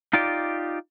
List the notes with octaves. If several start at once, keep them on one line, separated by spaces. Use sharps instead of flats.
D#4 F4 G4 D5